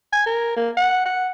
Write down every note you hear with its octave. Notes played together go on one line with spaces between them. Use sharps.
G#5
A#4
A#3
F#5
F#5